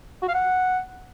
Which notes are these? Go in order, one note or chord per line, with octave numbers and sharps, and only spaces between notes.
F#4
F5
F#5